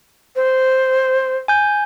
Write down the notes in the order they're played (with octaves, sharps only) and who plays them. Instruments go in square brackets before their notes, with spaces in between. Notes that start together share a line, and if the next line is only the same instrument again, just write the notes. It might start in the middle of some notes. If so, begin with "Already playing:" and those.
[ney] C5
[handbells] G#5 G6